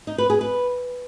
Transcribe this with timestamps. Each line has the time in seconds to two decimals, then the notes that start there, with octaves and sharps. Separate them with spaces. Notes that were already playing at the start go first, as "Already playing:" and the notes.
0.07 D#4
0.18 B4
0.30 G#4
0.41 B4